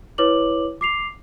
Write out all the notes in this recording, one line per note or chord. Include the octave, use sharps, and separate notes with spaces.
E4 B4 C#5 D6 F#7
D6 C7 F7